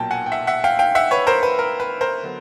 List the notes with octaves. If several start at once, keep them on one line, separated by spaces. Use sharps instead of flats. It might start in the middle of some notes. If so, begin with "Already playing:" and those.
Already playing: B1 A#2 F#3 G5 A5
F#5 G#5
G5
E5 F#5
E5 F#5
F5 G5
F5 G5
E5 F#5
B4 C#5
A#4 C5
B4
A#4
B4
A#4 C5
D3 F#3 B3